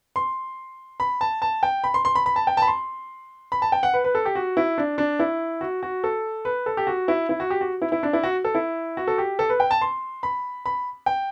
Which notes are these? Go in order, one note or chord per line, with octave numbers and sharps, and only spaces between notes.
C6
B5
A5
A5
G5
B5
C6
C6
B5
B5
A5
G5
A5 B5
C6
B5
A5
G5
F#5
B4
B4
A4
G4
F#4
E4
D4
D4
E4
F#4
F#4
A4
B4
A4
G4
F#4
E4
E4
F#4
G4
F#4
E4
E4
D4
E4
F#4
A4
E4
F#4
A4
G4
A4
B4
G5
A5
C6
B5
B5
G5